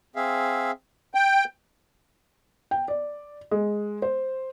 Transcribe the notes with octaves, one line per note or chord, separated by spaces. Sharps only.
C4 G#4 E5 F5
G5
G5
D5
G#3
C5